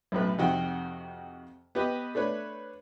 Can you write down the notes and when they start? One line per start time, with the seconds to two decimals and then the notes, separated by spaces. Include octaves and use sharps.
0.12 B1 F#2 A2 B4
0.38 F2 C3 D#3 F#4 F#5 G5
1.75 B3 G4 B4 D#5
2.15 A3 D4 B4 C#5